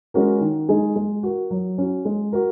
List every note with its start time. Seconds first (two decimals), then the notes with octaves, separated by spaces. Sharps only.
0.14 G#3 C#4 F#4 A#4
0.41 D#3
0.69 G#3 D#4 G#4
0.96 G#3
1.23 F#4 A#4
1.51 F#3
1.78 C#4 F#4
2.05 G#3
2.33 F#4 A#4